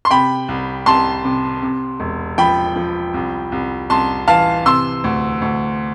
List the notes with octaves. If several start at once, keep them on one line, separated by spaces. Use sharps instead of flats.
C6
C3 G5 B5
C2
C2 A5 C6
C3
C3
E1
F3 G5 B5
F3
C2
C2
C2 A5 C6
E3 F5 A5
C3 C6 E6
D2
D2